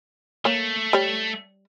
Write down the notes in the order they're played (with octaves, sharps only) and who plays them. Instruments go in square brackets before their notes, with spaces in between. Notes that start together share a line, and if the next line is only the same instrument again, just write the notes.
[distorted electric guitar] A3 [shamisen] A#3 C#5
[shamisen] G3 C#5